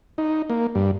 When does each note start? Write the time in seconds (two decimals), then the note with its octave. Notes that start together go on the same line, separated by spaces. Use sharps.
0.18 D#4
0.50 A#3
0.75 G2